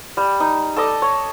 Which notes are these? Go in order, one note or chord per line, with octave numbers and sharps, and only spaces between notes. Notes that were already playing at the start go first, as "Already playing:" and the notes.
G3
D#4
A4 D5 D#5
C#5